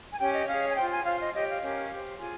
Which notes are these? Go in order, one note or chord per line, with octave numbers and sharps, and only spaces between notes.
G#5
C#4 G4 C#5 G5
D#5
C#4 G#4 C#5 F5
G#5
F4 C5 G5
G#5
F4 C5 F5
D#5
G4 C#5 D#5
F5
C#4 G4 A#4 C#5
G4 C5
F4 G#4 G#5